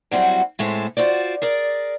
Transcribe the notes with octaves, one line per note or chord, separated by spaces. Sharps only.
F#3 G3 C4 E4 F#4
A2 G#3 A3 C4
F4 F#4 C5 D5
G#4 A#4 D5